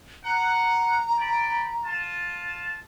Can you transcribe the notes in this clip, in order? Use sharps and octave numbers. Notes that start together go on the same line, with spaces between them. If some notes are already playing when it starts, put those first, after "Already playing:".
F#5 A#5
D5 G5 B5
F4 A5